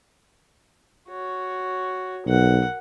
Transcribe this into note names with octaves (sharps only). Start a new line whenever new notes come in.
F#4 C#5
B1 A#4 F#5